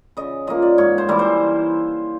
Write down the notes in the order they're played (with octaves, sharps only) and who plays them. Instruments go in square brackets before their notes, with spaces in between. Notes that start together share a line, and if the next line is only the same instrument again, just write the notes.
[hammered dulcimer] C#3 D#5
F3 A#3 D#5
D5
G#2 C#5
C5
E3 G3 A#3
C5